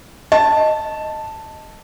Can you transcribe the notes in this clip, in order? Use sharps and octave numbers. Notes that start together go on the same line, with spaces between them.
D#5 A5